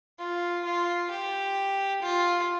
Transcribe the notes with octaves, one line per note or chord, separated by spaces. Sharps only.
F4
F4
G4
F4